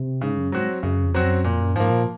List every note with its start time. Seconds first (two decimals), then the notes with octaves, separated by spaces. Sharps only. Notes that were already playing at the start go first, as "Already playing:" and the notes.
Already playing: C3
0.21 G#2 C#3
0.37 F#2
0.52 G#2 F#3 C4 F#4
0.83 F#2 C#3
1.03 F2
1.14 F#3 C4 F#4
1.24 F#2
1.44 F2 A#2
1.60 F#2
1.75 G#2 F3 A#3
1.90 A#2